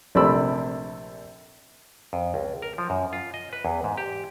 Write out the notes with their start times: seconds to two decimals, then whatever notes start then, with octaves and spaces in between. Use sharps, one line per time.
0.15 A#1 C3 A3 D5 B5 E6
2.13 F2
2.34 C#2
2.62 A#4
2.78 F3
2.90 F#2
3.13 F4
3.34 D#5
3.53 B4
3.65 E2
3.84 G#2
3.97 G4